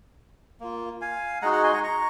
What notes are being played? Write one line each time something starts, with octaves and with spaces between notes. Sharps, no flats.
A#3 F4
F5 G#5
G#3 D#4 F#4 F#5 A#5
F#5 A#5
G#5 C6
A#5 C#6
A#5 C#6